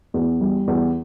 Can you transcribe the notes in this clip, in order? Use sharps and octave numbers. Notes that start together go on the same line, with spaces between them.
E2
G3
E2